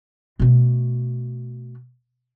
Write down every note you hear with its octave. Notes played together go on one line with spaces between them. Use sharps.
B2 A3